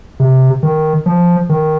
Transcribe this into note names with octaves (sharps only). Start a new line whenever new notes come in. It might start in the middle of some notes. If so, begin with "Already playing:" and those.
C3
D#3
F3
D#3